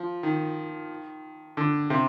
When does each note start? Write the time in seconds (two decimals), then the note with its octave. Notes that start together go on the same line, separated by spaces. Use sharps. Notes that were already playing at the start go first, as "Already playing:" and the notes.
Already playing: F3
0.23 D#3
1.57 D3
1.90 C3